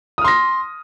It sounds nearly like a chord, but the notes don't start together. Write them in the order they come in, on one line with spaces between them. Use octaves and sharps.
D#6 F6 C6 A#6